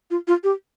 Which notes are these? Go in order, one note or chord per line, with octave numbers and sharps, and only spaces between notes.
F4
F4
G4